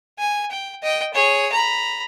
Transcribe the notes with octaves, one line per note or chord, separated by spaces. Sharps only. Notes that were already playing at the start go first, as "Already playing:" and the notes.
G#5
G5
D#5 G5
G#4 C#5
A#5 B5